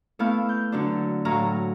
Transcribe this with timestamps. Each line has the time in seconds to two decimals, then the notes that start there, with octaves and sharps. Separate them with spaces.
0.19 A3 B3 E4 F5
0.49 G6
0.72 D3 F#3 D4
1.25 A2 F#3 F5 A#5